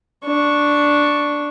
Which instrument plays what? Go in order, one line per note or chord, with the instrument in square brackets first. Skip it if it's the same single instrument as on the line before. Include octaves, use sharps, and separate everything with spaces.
[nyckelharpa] D4 C#6